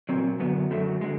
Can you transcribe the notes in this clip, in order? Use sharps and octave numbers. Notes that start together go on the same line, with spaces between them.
A#2 F#3 C4
F#2 D3 F#3 B3
F#2 D3 F#3 A3
D3 G#3